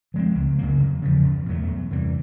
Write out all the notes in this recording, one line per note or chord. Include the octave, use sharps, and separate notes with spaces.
F3 G#3 C4
C#2
C#3 F#3 A#3
E2
C#3 F3
E2
B2 F#3 A3
E2
C3 E3 G3